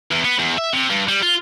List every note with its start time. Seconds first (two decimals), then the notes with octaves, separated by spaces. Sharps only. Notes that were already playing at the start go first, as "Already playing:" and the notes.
0.12 E2
0.25 B3
0.39 E2
0.58 E5
0.74 C3
0.90 G2
1.09 G3
1.23 F4